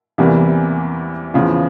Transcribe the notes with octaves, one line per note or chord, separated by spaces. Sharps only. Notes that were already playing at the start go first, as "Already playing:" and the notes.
E2 C3 E3 G3 A#3
E2 C#3 F3